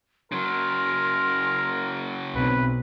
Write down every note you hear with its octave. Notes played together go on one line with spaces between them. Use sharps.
C#3 F#3 A#4 C6
B1 C4 B4